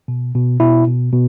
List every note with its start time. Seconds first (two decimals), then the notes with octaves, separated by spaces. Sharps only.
0.08 B2
0.35 B2
0.60 B2 E4
0.87 B2
1.13 B2